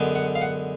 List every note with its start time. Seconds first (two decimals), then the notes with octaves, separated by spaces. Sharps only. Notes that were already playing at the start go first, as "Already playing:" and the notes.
Already playing: F#2 D3 G#3 B3
0.15 F#5
0.35 F5
0.42 F#5